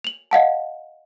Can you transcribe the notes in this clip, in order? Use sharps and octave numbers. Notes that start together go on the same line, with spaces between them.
F7 F#7
D#5 F5 F#5 A5